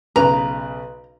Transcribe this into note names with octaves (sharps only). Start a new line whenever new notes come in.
B1 C#3 B4 A#5